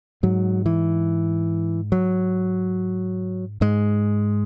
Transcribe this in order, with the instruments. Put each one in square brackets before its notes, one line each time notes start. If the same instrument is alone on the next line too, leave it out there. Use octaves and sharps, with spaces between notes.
[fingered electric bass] G#2 F#3
E3
F#3
G#2 G#3